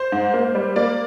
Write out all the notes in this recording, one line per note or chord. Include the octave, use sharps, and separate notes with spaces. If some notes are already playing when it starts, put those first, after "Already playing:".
Already playing: C5
G#2
A#3
G3
A#3 D5